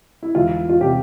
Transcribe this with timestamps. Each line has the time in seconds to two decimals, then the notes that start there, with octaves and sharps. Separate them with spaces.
0.23 E4
0.35 E1 F4
0.69 F4
0.80 C3 F3 G4